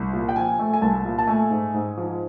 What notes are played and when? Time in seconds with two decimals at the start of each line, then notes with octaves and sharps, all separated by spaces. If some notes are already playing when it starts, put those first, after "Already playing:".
Already playing: C2
0.13 A#2
0.29 G5
0.36 F3 G#5
0.59 A3
0.74 G#5
0.82 C2 A5
1.05 A#2
1.18 A5
1.28 A3 G#5
1.50 G#2
1.74 G#2
1.98 F3